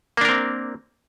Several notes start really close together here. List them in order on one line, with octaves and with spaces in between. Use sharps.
A#3 D4 A#4 C4